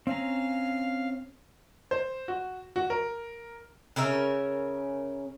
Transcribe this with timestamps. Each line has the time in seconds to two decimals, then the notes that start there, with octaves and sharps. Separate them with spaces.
0.07 C4 C#4 F5 A#5
1.91 C5
2.28 F#4
2.76 F#4
2.90 A#4
3.96 C#3 C#4 A#4 E5